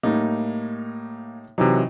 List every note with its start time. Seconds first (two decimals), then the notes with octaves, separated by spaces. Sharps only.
0.03 A2 G3 A#3 D#4
1.58 C3 E3 F#3 D#4